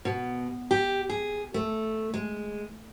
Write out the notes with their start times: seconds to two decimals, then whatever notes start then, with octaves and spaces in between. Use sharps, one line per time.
0.05 B2
0.71 G4
1.10 G#4
1.54 A3
2.14 G#3